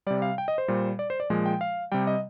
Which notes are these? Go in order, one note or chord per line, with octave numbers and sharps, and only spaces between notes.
C3 G3 D5
F5
G5
D#5
C5
A#2 G3
D5
C5
D5
A#2 F3 G#3
G5
F5
C3 G3 G5
D#5